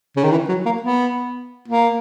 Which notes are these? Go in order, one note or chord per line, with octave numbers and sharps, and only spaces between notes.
C#3
D#3
E3
F#3
A#3
B3
A#3